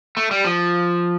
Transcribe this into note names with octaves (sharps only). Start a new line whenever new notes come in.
A3
G3
F3